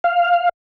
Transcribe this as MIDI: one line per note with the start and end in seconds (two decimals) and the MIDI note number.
0.04 0.49 77